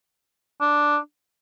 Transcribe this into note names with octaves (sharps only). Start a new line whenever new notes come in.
D4